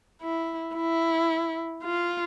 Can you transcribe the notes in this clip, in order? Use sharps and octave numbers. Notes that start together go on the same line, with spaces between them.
E4
E4
F4